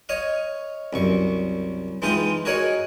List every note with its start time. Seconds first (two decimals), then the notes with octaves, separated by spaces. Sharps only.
0.09 C#5 D#5 F5
0.93 C2 F#2 C#6
2.02 E3 G#3 D#4 F4 G5 D#6
2.45 F#4 G#4 A#4 C#5 D#5 F#5